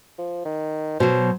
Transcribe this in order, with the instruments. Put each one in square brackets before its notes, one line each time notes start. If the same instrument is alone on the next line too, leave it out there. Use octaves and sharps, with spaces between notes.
[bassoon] F3
D#3
[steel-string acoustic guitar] B2 F#3 [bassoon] C5